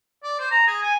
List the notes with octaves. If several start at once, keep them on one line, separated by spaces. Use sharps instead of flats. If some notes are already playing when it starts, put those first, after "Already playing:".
D5
C5
A#5
G#4
G#5